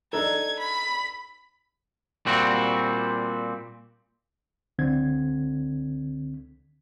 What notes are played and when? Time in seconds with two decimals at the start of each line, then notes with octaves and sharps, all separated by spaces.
0.13 D4 D#4 A4 G#6
0.59 B5
2.26 A#2 G3 C4 F#4
4.79 C#2 D3 C4 G#6